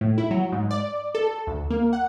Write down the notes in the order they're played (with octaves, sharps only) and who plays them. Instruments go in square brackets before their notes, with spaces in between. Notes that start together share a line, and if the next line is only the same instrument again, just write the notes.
[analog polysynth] A2
E4
F#3
G#2
D5
A4
D2
A#3
F#5